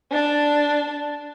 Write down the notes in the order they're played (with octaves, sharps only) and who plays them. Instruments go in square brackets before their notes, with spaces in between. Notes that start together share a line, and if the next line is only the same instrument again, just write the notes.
[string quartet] D4 A5